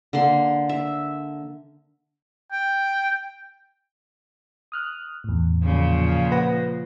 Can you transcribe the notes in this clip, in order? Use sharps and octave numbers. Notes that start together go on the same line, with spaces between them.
D3 A#3 C6
E5
G5
D#6 F6 F#6
E2 A2
A#2 C#3 F3
B4 F#5 A#6